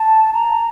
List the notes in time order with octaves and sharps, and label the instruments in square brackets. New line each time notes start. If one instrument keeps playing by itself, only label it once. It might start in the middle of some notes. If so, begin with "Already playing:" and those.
Already playing: [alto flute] A5
A#5